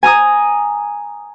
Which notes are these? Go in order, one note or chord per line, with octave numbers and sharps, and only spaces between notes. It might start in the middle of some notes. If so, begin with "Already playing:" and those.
G#5 A#5 D#6